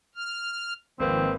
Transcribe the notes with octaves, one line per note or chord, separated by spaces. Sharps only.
F6
G#1 D#3 F3 A#3 C4 B4